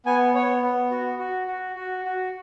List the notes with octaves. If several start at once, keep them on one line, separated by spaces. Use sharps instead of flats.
B3 G#5
B3 C#5
B3
F#4
F#4
F#4
F#4
F#4